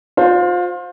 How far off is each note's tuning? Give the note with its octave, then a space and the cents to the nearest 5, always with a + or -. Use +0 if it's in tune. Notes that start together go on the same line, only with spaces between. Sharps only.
F4 +30 C5 +0